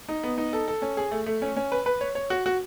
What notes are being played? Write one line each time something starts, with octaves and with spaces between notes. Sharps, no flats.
D#4
B3
D#4
A4
A4
C#4
G#4
A3
A3
C#4
C#4
B4
B4
C#5
C#5
F#4
F#4